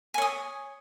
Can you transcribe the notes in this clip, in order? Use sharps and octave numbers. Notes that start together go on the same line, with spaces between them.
C#5 G#5 D#6